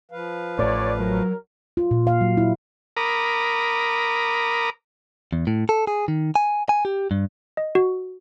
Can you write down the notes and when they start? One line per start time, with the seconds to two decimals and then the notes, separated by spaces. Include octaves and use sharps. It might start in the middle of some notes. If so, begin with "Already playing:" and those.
0.11 F3 B4 F5
0.59 A1 A2 C#5 D5
1.00 F#3 A#4
1.77 F4
1.91 A#2
2.07 F5
2.21 F#3
2.37 E4
2.97 A#4 A#5 B5 D6 D#6
5.33 E2
5.47 A2
5.69 A4
5.87 G#4
6.08 D#3
6.36 G#5
6.69 G#5
6.85 G4
7.11 G2
7.57 D#5
7.75 F#4